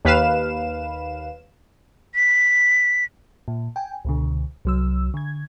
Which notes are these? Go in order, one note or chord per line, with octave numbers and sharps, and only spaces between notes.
D#2 B4 F5 E7
B6
A#2
G5 G#5
C#2 B2 D3
C2 F#3 E6
D3 G#6